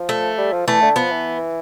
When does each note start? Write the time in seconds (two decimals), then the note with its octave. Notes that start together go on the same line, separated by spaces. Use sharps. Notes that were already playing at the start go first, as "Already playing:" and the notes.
Already playing: F3
0.09 A3
0.38 G3
0.52 F3
0.67 E3 A3
0.82 D3
0.96 F3 B3
1.11 E3